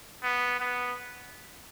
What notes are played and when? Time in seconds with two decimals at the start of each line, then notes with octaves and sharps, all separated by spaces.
0.23 B3
0.60 B3